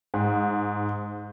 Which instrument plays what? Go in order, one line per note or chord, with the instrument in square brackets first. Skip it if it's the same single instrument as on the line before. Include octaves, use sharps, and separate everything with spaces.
[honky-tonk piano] G#2